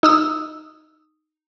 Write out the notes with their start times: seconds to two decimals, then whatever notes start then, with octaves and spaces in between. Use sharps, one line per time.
0.03 D#4 D#6 E6